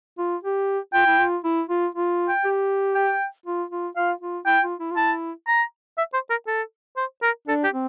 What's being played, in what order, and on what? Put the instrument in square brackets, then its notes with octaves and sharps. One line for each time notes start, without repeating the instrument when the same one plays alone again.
[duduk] F4
G4
[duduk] F4 [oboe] G5
[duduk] E4
F4
E4
F4
F4
[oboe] G5
[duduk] G4
[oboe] G5
[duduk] F4
F4
[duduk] F4 [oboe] F5
[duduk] F4
[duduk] E4 [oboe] G5
[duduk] F4
E4
F4
[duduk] E4 [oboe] A5
[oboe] A#5
E5
C5
A#4
A4
C5
A#4
[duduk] D4 [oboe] A4
[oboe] G4
[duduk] C4